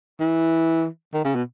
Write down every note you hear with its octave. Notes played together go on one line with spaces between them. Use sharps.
E3
D#3
C#3
B2